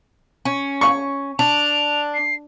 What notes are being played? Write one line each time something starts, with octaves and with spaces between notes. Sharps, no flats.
C#4
C#6
D4 F7
C7